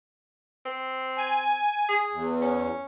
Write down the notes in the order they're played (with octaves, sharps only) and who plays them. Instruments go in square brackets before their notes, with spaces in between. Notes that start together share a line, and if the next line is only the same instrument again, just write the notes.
[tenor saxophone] C4
[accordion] G#5
[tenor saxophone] G#4
[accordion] E2
[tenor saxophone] C#4